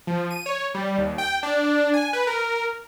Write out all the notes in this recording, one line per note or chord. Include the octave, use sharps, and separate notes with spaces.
F3
D#7
C#5
G3
D#2
G5
D4
G#5
B4
A#4